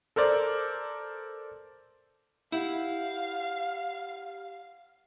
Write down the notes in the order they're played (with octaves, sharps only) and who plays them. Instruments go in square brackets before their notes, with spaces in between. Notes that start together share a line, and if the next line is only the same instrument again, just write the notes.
[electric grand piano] A4 A#4 C5 D5
[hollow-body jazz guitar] E4 [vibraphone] G4 F#5 [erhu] F5